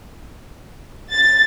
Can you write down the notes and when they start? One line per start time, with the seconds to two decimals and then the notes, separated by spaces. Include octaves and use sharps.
1.12 A6